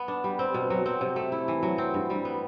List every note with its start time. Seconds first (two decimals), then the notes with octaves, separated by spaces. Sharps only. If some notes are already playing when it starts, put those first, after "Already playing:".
Already playing: B3
0.08 D4
0.24 G3
0.39 C4
0.54 B2
0.70 F#3
0.86 C4
1.01 C3
1.16 A3
1.32 E4
1.48 E3
1.63 F#3
1.78 C4
1.94 G2
2.10 G3
2.25 B3